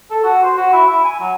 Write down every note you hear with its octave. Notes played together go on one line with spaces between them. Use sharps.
A4
F#4
C5
F#4
E4
E4
G#5
F#3